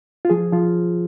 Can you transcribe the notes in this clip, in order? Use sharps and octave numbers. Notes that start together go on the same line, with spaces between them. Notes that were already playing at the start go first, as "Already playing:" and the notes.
F4
F3 G#4
F3 F4